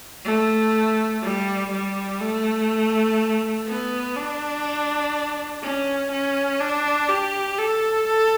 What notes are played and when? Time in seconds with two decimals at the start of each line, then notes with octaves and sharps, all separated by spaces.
0.25 A3
1.22 G3
1.71 G3
2.20 A3
3.67 B3
4.16 D4
5.63 C#4
6.11 C#4
6.60 D4
7.09 G4
7.58 A4
8.07 A4